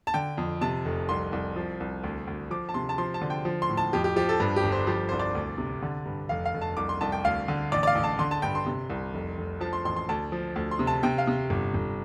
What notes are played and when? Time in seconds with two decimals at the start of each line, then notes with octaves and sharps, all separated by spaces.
0.07 A5
0.14 D3 G5
0.38 F2
0.61 C3 A5
0.85 F1
1.09 C2 C6
1.32 C2
1.56 F3
1.80 C2
2.03 D2
2.27 D2
2.50 F3 D6
2.69 A5
2.74 C3 C6
2.89 A5
2.98 F3 C6
3.14 A5
3.21 D3
3.30 G5
3.45 F3
3.62 C6
3.69 A2
3.77 A5
3.93 F2 G4
4.04 G4
4.16 F3 G4
4.29 A4
4.40 G2
4.56 G4
4.64 G1
4.72 C5
4.87 F3 G4
5.09 C2 C5
5.19 D5
5.35 D2
5.58 C3
5.82 D3
6.06 G2
6.29 F1 F5
6.45 F5
6.54 F1
6.61 A5
6.77 C2 D6
6.89 C6
7.01 C2 A5
7.12 G5
7.24 D2 F5
7.48 D3
7.72 A1 D5
7.83 D5
7.87 F5
7.95 A1
8.04 A5
8.19 D3 C6
8.31 A5
8.42 G2 G5
8.55 C6
8.66 C3
8.90 C2
9.14 F1
9.38 F1
9.60 F3 A5
9.73 C6
9.85 A1 C6
9.96 C6
10.09 D2 A5
10.32 F3
10.56 D2
10.71 C6
10.79 C3
10.87 A5
11.03 C3 G5
11.18 F5
11.27 C3
11.50 G1
11.74 G1